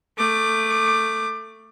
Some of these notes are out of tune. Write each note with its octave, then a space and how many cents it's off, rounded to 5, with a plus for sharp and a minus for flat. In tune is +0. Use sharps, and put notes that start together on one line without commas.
A3 +15 D6 +20